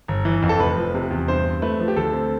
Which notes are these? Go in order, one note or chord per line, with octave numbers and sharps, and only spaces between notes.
G1
E3
F2
A4
F1 B4
F3
C3
E2
G2 C5
C4
A3 B4
F3
G4
D2 A4
C4